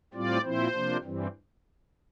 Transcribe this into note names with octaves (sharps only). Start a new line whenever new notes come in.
A2 G3 C4 F4 D5
A#2 F3 C4 E4 C5
C3 F3 A#3 D4
G2 E3 G3 C4